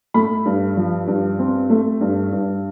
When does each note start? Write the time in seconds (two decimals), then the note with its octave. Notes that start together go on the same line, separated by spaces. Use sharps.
0.14 A3 B5
0.45 G2
0.77 F3
1.07 G2
1.39 C4
1.70 A3
2.01 G2
2.32 G2